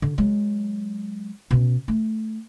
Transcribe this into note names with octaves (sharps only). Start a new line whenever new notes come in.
D3
F#3 G#3
B2 C#4
A3